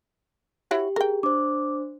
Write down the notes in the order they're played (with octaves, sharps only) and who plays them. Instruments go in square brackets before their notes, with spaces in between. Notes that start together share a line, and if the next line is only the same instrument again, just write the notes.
[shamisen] E4 F#4 C#5 [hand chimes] G4
[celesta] G#4 [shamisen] A#4 G5
[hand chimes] D4 C5 [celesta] D6